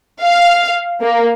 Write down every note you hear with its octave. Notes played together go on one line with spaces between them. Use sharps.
F5
A#3